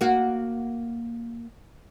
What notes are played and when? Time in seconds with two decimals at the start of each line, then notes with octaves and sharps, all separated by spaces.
0.01 A#3 F#4